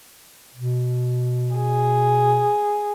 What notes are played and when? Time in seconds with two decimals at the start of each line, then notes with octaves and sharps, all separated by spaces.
0.55 B2
1.56 G#4